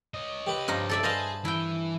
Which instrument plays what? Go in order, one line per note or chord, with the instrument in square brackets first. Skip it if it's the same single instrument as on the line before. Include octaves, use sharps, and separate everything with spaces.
[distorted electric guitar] C#5 D#5
[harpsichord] G4 B4
[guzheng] G2 F3 D#4
A4 D5 E5
[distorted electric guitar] G#4 [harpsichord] B4 A5 [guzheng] C5 D#5 F5
[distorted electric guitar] E3 [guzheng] E4 G5